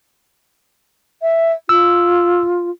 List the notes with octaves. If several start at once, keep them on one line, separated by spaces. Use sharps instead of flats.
E5
F4 E6